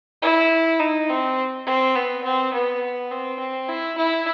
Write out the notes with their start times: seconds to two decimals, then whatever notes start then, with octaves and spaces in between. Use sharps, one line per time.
0.22 E4
0.80 D#4
1.09 C4
1.67 C4
1.96 B3
2.24 C4
2.53 B3
3.11 C4
3.40 C4
3.68 E4
3.98 E4